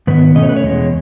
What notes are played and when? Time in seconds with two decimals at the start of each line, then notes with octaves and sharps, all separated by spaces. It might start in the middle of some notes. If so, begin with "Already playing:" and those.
0.07 G#2 D#3 B3 B4
0.35 B2 A3 C#4 D#5
0.43 C#5
0.49 B4
0.56 C#5
0.63 E2 B2 G#3